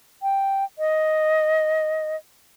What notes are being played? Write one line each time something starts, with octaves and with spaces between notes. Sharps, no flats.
G5
D#5